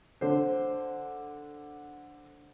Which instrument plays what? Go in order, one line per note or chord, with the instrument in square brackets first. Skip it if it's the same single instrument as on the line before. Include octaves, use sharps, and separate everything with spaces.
[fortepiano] D3 C5